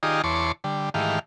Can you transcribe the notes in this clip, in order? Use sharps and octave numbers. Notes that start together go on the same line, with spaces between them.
D#3 D#4 F4 G4 G#4 D5
E2 C#5 A5 C6 D6
D3 G3
G#2 D#3 E3 A3 G4 F5